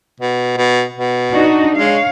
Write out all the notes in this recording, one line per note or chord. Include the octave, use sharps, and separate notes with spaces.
B2
B2
B2
D4 D#4 F#4
G#3 C#5 F5